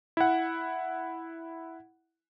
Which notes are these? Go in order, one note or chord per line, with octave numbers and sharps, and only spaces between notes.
E4 F#5